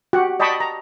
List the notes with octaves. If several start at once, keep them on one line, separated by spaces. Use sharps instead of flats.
F#4 G4 F#5
D5 D#5 G5 A5 B5 C#6
A#5